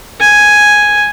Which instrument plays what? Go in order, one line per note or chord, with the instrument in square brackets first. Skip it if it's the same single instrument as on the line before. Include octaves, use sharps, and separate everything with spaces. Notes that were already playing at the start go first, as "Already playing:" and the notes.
[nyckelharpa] G#5